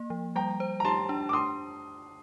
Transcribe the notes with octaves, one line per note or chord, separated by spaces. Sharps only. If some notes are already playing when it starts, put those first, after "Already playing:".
Already playing: A#3
F3
G3 G5 A#5
C5
A#5
G4 A5 C6
D4
D6
D4 C6 D#6